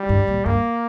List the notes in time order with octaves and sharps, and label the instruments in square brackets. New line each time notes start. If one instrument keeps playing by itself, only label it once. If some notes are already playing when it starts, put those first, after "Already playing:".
Already playing: [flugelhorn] G3
[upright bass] G2
A#2
[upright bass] G2 [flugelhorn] A#3